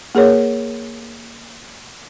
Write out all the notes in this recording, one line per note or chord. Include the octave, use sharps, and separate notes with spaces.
A#3 G#4 A#4 C#5